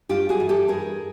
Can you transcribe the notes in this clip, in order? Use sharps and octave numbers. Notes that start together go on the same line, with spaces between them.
G2 F4 G4
F#4 G#4
E3
G4 A4
G2 G#4 A#4